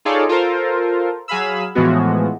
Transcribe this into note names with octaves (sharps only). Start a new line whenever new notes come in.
D#4 F4 G#4 A4 C#5 D5
F4 A4 A#4 C5
F#3 G#4 F5 B5 E6
A2 E3 F3 G#3 B3 F#4